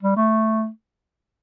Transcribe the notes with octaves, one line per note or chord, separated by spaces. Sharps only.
G3
A3